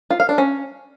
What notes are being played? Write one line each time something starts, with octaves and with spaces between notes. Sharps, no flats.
F4
F5
D4
C#4